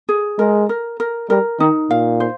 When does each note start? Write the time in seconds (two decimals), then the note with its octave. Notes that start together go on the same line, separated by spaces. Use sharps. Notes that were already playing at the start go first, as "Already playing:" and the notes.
0.09 G#4
0.38 G#3 A#4
0.69 A#4
1.00 A#4
1.29 G3 A#4
1.60 D#3 D#4
1.90 A#2 F5
2.20 C5